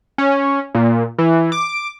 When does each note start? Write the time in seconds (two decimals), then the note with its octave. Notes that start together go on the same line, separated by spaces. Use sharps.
0.18 C#4
0.74 A#2
1.18 E3
1.52 D6